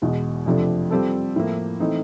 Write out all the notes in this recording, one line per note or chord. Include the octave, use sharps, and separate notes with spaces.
E2 B2 G#3
F2 C3 F3 A3 D4
G3 C4 F4 A4
A2 F3 A#3
E3 A3 C4 D#4